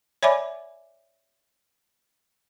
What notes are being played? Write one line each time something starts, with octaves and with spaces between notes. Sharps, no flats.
C#5 D5 E5 G#5 B5 D6